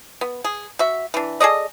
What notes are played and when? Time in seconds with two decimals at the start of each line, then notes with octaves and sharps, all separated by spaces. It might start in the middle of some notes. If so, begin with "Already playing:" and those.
0.21 B3
0.44 G#4
0.79 F#4 E5
1.14 E3 D4
1.40 G#4 A4 D5 D#5